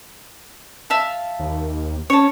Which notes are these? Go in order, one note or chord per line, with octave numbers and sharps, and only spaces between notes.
E5 F5 A5
D#2
C#4 C#5 A5